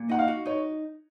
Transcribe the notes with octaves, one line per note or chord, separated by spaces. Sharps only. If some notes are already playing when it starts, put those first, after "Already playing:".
Already playing: A#2
D#4 F#5
F5
F#4
D#4 C#5